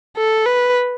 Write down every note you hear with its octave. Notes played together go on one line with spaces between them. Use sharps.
A4
B4